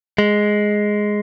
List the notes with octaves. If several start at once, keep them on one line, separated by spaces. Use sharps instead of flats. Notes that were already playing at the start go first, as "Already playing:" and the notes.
G#3